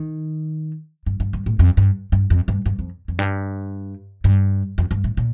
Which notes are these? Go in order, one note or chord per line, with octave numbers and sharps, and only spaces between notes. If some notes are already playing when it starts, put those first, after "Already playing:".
Already playing: D#3
G2
G2
G2
A2
F2
G2
G2
F2
G2
G2
F2
F2
G2
G2
F2
G2
A2
A#2